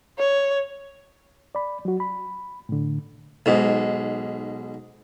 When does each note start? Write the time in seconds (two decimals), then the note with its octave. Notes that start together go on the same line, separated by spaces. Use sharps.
0.18 C#5
1.55 D5 B5
1.85 F#3 F#4
2.00 B5
2.69 A2 D3
3.46 B1 G#2